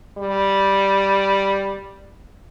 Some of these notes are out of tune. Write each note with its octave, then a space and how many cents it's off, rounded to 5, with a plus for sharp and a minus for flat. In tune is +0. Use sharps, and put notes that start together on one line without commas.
G3 +0